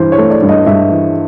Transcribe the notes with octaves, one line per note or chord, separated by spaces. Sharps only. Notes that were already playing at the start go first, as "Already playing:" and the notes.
Already playing: G2 E3 C5
C#5
A3
D5
G2
D#5
G2 E5
E3